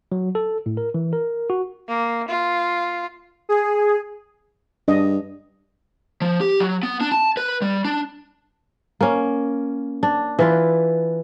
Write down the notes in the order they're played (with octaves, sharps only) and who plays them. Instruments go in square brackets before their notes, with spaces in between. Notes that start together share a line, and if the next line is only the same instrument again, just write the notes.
[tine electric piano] F#3
A4
A2
A#4
E3
A#4
F#4
[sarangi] A#3
F4
[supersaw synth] G#4
[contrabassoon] G2 [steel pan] D4 D#5
[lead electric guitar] F3
G4
F#3
B3
D4
A5
B4
G3
D4
[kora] A#3 C#4
D4
E3 F4 B4